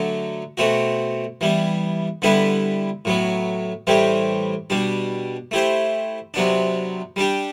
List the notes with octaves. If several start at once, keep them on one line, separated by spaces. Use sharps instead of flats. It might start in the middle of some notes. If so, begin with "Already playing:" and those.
Already playing: D3 F#3 A3
B2 A3 C4 F#4
E3 G3 B3
D3 G3 B3 E4 B4
A2 F#3 B3
A2 E3 G3 C4 G4
B2 G3 D4
A3 E4 G4 C5
C3 F#3 B3 D4
G3 D4 G4